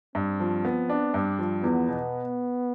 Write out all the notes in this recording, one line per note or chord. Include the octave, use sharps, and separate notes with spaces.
G2 C4
F3
B3
D4
G2
F3
E2 B3
B2